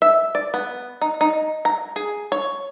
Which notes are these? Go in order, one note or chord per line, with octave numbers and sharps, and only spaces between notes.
E5
D5
B3
D#4
D#4
A#5
G#4
C#5